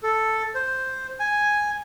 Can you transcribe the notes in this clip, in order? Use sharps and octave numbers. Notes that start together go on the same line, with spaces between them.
A4
C5
G#5